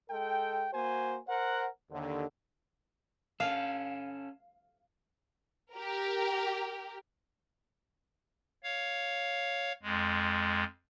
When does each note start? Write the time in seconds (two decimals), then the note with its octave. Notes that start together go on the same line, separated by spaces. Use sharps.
0.10 G#3 A4 G5
0.74 A#3 F#4 C5 G#5
1.29 A#4 C5 F#5
1.91 D#2 D3
3.40 C#4 A4 F5
5.74 G4 A#4
8.64 C#5 F5
9.83 F2 G#3